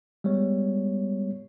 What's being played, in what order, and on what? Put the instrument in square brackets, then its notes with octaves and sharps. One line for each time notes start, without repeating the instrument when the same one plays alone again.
[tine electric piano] G3 G#3 B3 C#5